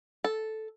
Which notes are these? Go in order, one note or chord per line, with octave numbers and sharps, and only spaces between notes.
A4